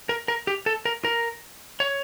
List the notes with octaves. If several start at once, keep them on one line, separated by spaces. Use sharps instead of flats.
A#4
A#4
G4
A4
A#4
A#4
C#5